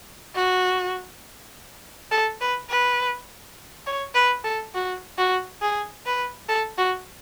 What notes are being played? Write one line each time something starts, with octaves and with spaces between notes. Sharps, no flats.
F#4
A4
B4
B4
C#5
B4
A4
F#4
F#4
G#4
B4
A4
F#4